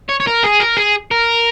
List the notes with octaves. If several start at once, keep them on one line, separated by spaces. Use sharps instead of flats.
C#5
C#5
A#4
G#4
A#4
G#4
A#4